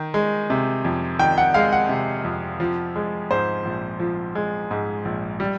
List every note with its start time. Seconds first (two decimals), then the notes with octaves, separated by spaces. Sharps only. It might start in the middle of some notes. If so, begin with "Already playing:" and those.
Already playing: D#3
0.14 G#3
0.50 C3
0.85 F2
1.19 D#3 G5
1.38 F#5
1.54 G#3 F5
1.73 F#5
1.89 C3
2.24 F2
2.60 F3
2.96 G#3
3.31 G#2 C5
3.65 A#1
3.99 F3
4.35 G#3
4.71 G#2
5.05 A#1
5.40 G3